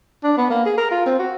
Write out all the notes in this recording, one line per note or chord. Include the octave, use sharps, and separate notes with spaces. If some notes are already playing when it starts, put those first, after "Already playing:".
D4
B3
A#3
G#4
A#4
F4
C4
F#4